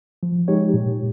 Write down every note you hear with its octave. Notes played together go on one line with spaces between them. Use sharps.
F3
G#3 D#4 G4 C#5
A#2